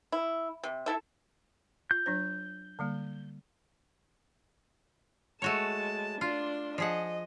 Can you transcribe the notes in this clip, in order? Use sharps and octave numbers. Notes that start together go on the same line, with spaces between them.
E4
C3
E4 A4 E5
F4 G6
F#3 D4 C5
D3 G3 A#3
G#3 A3 F#4 C#5 A5
D4 F4 C6
F3 G#4 D#5 F#5